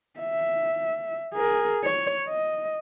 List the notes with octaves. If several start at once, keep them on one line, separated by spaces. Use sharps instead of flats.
E5
G#4 A#4
C#5
D#5